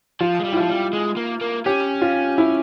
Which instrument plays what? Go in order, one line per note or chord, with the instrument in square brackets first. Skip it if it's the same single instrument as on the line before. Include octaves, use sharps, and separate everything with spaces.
[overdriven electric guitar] F3 [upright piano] F4
[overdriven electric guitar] G#3
G3
[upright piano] E4
[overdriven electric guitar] F3 [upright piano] F4
[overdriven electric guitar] G3
G#3
A#3
A#3
[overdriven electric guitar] C#4 [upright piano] G4
[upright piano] F4
E4